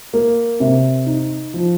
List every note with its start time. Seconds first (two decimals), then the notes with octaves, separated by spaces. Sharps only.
0.14 A#3
0.60 C3
1.06 D#4
1.54 F3